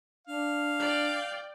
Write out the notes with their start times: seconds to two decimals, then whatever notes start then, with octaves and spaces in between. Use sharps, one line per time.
0.27 D4 F5
0.79 D5 G5